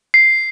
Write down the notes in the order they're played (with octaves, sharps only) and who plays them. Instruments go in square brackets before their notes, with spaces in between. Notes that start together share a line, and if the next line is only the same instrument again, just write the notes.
[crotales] C7